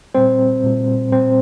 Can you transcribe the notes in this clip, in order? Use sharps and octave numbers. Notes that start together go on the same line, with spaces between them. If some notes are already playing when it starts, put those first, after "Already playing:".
A#2 G3 C4 C5
A#2 G3
A#2 G3 C4 C5